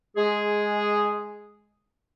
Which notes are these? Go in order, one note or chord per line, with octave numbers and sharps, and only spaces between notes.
G#3 G#4